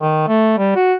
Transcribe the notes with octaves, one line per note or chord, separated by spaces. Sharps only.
D#3
A3
G3
F#4